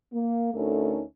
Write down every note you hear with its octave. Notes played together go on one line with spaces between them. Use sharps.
A#3
D2 A3 C#4 D#4 A4 A#4